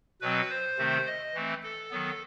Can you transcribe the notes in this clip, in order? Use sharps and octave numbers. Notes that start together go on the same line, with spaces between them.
B2 F#3 C4 B4
C5
C3 D#3 A3 C4
D#5
E3 A3 C4
A4
D#3 F#3 B3